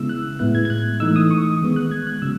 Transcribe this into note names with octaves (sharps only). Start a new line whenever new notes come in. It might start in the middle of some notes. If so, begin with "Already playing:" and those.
Already playing: C#3 G#3 B3 E4 E6
F#6
A2 G#3 B3 E4 F#6
G#6
G#6
F#6
E3 A3 D#4 E6
D#6
C#6
D#6
D#3 G#3 B3
F#6
G#6
F#6
C#3 F#3 E6